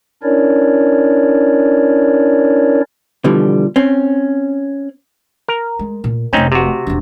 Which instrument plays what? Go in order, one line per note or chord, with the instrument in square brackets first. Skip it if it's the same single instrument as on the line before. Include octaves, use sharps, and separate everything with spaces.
[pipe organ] C#4 D4 E4 A#4 C#5 D5
[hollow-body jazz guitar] B2 D3 E3 F3 G3
C4 C#4
[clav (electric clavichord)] A#4
[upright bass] G#3
A#2
[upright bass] F1 A3 [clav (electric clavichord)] C4 C#4 D#4
[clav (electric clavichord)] C3 F#4
[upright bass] E1 D4